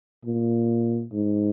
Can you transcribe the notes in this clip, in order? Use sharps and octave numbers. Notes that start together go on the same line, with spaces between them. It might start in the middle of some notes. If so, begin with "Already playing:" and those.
A#2
G#2